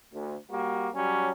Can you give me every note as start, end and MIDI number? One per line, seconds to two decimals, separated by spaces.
0.13 0.36 38
0.51 0.88 55
0.51 0.88 58
0.51 0.88 66
0.95 1.31 54
0.95 1.31 55
0.95 1.31 61